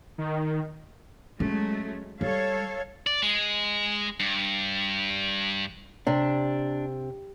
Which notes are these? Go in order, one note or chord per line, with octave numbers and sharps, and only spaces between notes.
D#3
F#3 G#3 A3 C#4
G3 A4 C#5 F5
D5
G#3
G2
C3 D4